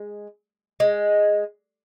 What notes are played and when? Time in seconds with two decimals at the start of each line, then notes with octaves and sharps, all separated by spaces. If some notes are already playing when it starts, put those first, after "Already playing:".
Already playing: G#3
0.80 G#3